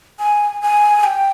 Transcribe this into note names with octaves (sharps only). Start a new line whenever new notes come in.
G#5
G#5
G5